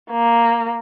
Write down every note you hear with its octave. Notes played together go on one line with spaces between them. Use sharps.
A#3